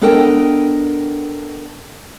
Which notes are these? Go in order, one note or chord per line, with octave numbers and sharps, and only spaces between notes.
B3 D4 A4 A#4 D#5 G5